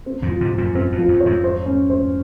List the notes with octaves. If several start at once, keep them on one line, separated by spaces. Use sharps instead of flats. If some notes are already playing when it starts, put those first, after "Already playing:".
C4
F2 G#2
F3
G#2 C3
F3
F#2 A#2
F#2 C4
F2
F3
F2
C#5
F2 G#2
C5
C#4
C5